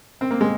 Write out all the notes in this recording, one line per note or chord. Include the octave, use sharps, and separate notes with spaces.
C4
A#3
G#3